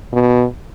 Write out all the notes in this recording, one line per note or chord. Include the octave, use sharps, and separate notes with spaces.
B2